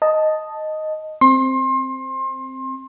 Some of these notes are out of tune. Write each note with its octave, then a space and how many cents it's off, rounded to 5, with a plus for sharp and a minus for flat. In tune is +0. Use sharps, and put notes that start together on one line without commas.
D#5 +0 A5 +0
C4 +0 C6 +30